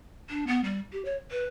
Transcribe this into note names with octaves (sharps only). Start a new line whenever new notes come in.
D4
B3
G3
G4
C#5
B4